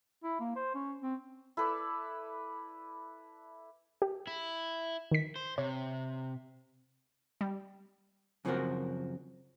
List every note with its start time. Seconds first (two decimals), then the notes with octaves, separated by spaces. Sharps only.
0.24 E4
0.40 A#3
0.56 C5
0.75 C#4
1.02 C4
1.57 E4 A4 B4 D5
4.02 G4
4.27 E4
5.11 D#3 B6
5.36 C5
5.58 C3 C#5
7.41 G3
8.45 F#2 C#3 F3 C4 F#4 A#4